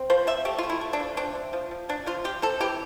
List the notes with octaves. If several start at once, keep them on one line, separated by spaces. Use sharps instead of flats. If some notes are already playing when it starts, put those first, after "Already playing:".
Already playing: C4
F3 C5
F3 E5
A3 G4
A3 F4
E4
A3
D4
F3
C4 D4
C4
F3
F3
F3 D4
F3 F4
C4 G4
C4 A4
E3 G4